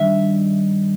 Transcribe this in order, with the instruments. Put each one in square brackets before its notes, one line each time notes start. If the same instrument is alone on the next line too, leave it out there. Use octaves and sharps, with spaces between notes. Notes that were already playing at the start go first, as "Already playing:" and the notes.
Already playing: [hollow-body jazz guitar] G2 D#3 E5